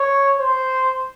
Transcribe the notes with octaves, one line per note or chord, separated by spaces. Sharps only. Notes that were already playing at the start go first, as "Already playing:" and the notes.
Already playing: C#5
C5